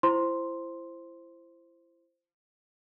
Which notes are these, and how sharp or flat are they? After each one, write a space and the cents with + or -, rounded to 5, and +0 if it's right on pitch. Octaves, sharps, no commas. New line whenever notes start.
E4 +30 C5 +0 C6 +0